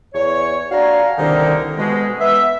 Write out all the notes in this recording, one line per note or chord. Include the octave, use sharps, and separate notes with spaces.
E2 C#5
D4 F#4 F5 G#5 A#5
C2 D3 D#3 A#3 D#4
B2 G#3
B3 E5